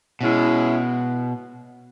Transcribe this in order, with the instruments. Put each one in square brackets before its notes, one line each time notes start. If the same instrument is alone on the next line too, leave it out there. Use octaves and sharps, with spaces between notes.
[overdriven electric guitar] B2 [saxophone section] G#3 C#4 E4